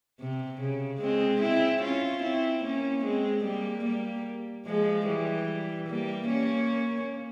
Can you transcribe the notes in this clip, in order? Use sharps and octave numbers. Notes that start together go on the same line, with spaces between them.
C3
C#3
G#3 C4
C4 E4
C#4 F4
C4 E4
A#3 C#4
G#3 C4
G3 A#3
G3 A#3
F3 G#3
E3 G3
G3 A#3
A#3 C#4